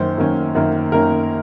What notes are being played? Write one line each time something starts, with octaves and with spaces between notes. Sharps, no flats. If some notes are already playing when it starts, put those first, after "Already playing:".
Already playing: F#2 D#3 A#3 C#4 C5
F#2 D#3 A#3 C#4
F#2 D#3 A#3 C#4
F#2 D#3 A#3 C#4 A#4